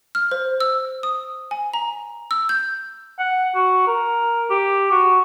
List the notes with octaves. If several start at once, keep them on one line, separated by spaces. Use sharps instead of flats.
F6
C5
E6
D#6
G#5
A#5
E6
G6
F#5
F#4
A#4
G4
F#4